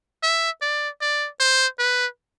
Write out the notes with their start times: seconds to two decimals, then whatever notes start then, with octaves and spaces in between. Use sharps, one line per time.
0.23 E5
0.62 D5
1.01 D5
1.40 C5
1.79 B4